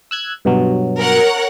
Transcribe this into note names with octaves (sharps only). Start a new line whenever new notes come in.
E6 F#6 G#6
G2 B2 F#3
A#4 C#5 F#5